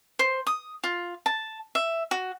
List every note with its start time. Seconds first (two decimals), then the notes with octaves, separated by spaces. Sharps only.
0.19 C5
0.47 D#6
0.84 F4
1.26 A5
1.75 E5
2.11 F#4